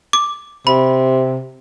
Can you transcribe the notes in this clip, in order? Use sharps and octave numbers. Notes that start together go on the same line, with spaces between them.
D6
C3 B5